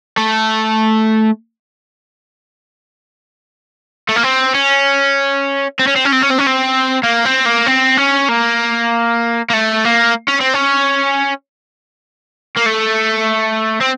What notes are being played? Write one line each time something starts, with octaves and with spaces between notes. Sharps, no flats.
A3
A3
A#3
C4
C#4
C4
C#4
C4
C#4
C4
C#4
C4
C#4
C4
A#3
C4
A#3
C4
C#4
A#3
A#3
A3
A#3
C#4
C4
C#4
A#3
A3
C4